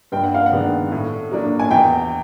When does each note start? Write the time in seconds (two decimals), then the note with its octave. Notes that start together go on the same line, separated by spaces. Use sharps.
0.12 G2 G5
0.24 F#5
0.34 F5
0.46 F#5
0.52 D#3 G#3 B3 D4
0.92 A2
1.31 F#3 A#3 D4
1.59 G#5
1.71 E2 G5